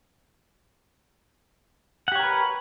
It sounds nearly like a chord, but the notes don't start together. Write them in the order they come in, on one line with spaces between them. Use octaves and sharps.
F#5 G4 C#5 A#4 B4